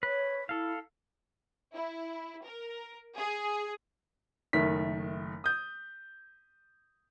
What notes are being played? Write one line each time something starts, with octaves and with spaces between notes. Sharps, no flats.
B4 C#5
E4 A4 F5
E4
A#4
G#4
F#1 D#3 A3 B6
D#6 G6